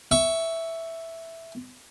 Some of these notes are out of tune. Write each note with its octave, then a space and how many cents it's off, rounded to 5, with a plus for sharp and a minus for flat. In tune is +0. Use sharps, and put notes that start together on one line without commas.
E5 +0 C#6 +15